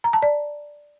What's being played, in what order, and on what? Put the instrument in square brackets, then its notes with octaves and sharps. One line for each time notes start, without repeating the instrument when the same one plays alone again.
[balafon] A#5
A5
D5